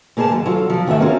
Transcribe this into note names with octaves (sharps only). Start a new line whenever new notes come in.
A#2 A#3 G#4 B4 A5
D#2 G#2 F#3
F#3 F4 A4
F3 F#3
G#2 D#3 A3 F#4 E5
C4 C#4 F4 F#4 G#4 A#4